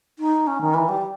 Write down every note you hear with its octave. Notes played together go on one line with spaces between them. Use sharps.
D#4
C#4
D#3
E3
G3